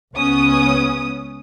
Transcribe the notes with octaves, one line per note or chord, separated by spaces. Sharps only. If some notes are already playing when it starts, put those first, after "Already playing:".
C#2 B3 C#4 D#6